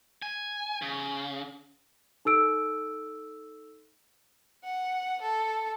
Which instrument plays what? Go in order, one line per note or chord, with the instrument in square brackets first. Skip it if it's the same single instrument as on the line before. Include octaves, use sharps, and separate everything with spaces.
[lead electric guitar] G#5
C#3
[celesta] D#4 A4 E6 D7
[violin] F#5
A4